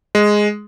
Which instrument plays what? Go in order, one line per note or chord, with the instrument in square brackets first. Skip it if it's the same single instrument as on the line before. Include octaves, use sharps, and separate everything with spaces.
[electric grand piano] G#3